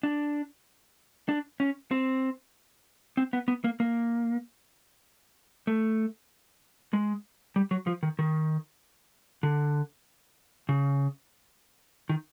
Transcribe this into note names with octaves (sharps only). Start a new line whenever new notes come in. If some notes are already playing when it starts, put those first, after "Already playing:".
D4
D4
C#4
C4
C4
B3
B3
A#3
A#3
A3
G#3
G3
F#3
F3
D#3
D#3
D3
C#3
D#3